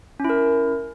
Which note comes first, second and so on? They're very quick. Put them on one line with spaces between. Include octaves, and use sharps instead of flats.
C#4 E4 A#4